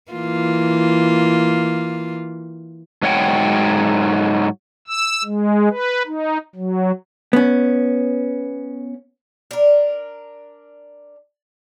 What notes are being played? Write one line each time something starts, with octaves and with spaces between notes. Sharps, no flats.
E3 A#3 F4
G#2 F#3 C#5 F#5 G5
E6
G#3
B4
D#4
F#3
B3 C#4
D4 A#4